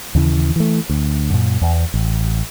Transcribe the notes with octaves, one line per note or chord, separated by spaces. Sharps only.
D#2 C#3 E3
E3 A3
D2
F#2 A#2
E2
A1